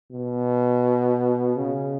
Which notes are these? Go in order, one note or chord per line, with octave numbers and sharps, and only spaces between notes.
B2
C#3